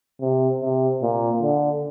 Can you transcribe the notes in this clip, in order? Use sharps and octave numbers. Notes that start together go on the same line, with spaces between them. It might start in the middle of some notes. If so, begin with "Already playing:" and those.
C3
C3
A#2
D3